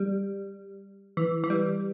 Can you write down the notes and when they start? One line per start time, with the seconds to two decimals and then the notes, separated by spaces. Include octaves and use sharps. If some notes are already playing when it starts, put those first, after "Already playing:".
Already playing: G3
1.17 E3
1.44 E3
1.50 G3